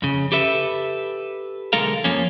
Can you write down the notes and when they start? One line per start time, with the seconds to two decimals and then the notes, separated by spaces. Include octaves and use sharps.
0.02 F2 C#3
0.32 G4 A4 B4 E5
1.73 B1 D3 G#3 A4 A#4 F5
2.04 F2 F3 A#3 C#4